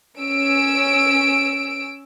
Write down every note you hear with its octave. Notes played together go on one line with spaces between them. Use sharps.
C#4 E6 D7